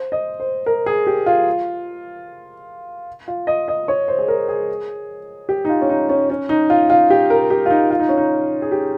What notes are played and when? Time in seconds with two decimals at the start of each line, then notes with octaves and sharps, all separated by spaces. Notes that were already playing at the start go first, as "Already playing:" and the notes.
Already playing: C5
0.12 D#5
0.40 C5
0.66 A#4
0.86 G#4
1.07 G4
1.26 F4
3.28 F4
3.47 D#5
3.68 D#5
3.88 C#5
4.08 C5
4.19 G#4
4.28 A#4
4.48 G#4
5.49 G4
5.65 D#4
5.69 F4
5.81 C#4
5.90 D#4
6.09 C#4
6.30 C#4
6.49 D#4
6.70 F4
6.90 F4
7.10 G4
7.30 A#4
7.50 G4
7.66 F4
7.70 D#4
7.91 F4
7.99 D#4
8.09 C#4
8.17 D#4
8.62 G#4
8.72 G4